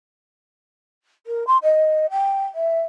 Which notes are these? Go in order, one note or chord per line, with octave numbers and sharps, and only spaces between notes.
A#4
C6
D#5
G5
E5